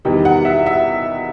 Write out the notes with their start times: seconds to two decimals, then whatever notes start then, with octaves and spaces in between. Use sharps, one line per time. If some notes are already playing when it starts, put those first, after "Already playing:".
0.05 E2 D#3 G3
0.25 F#5
0.45 E5
0.66 E5